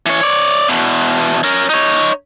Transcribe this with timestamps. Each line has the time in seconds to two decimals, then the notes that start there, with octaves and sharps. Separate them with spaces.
0.06 E3 C#5
0.21 C#5 D5
0.68 E2 B2
1.44 C#4 A#4
1.69 D#4 C#5